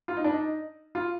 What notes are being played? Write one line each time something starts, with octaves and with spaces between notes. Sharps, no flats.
F4
D#4
D4
D#4
F4